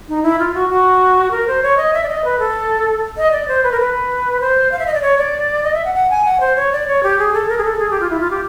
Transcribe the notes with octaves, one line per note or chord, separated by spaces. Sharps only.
D#4
E4
F4
F#4
F#4
A#4
C5
C#5
D#5
E5
D5
D#5
B4
A4
D#5
D5
C5
B4
A#4
B4
C5
F5
E5
D#5
D5
C#5
D5
D#5
E5
F#5
F#5
G#5
F#5
C5
C#5
D5
C#5
G4
G#4
A4
A#4
G#4
A4
G#4
G4
F4
E4
F4
G4